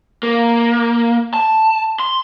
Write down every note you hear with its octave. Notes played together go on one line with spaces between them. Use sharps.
A#3
A5
C6